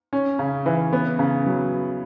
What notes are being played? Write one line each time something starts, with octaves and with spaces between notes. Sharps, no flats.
C#4
C#3
E3
B3
C#3
F#3